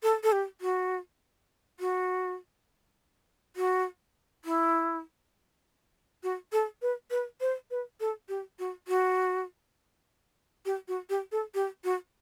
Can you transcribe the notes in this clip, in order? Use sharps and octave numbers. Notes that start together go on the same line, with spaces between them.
A4
A4
G4
F#4
F#4
F#4
E4
F#4
A4
B4
B4
C5
B4
A4
G4
F#4
F#4
G4
F#4
G4
A4
G4
F#4